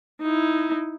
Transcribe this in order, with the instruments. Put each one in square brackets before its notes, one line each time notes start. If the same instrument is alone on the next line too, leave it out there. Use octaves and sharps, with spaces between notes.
[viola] D#4 E4